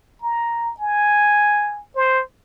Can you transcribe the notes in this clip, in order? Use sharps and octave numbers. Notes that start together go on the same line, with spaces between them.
A#5
G#5
C5